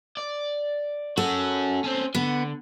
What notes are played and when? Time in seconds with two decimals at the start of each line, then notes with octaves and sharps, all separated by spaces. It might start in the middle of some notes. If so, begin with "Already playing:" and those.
0.17 D5
1.17 C#4 F#4 A4
1.84 C4 C#4
2.15 D3 B3